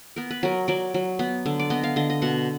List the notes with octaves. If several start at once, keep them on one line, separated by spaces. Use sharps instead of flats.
B3 A#4
B4
F#3 A#4
F#3 D5
F#3
B3
D3
D5
B3 D#5
F5
D3 D#5
D#5
B2 F#5